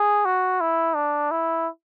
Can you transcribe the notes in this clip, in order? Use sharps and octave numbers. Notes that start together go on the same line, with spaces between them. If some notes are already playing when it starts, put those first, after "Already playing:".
Already playing: G#4
F#4
E4
D4
E4